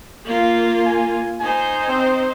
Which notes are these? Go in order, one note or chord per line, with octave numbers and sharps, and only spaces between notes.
A#3 F4
G#5
D#4 C5 G#5
C4